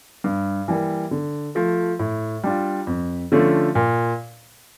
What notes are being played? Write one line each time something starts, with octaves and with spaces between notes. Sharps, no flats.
G2
E3 G3 A#3
D3
F3 A3
A2
G3 D4 F4
F2
D3 F3 A3 C#4
A#2